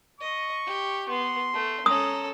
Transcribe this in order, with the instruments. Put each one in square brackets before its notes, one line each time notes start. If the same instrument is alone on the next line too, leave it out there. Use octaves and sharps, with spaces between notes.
[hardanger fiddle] D#5 [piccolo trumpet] C#6
[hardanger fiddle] G4
[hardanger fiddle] B3 [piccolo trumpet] C6
[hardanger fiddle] A3
[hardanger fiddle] C#4 A4 [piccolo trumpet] A#5 [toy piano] D#6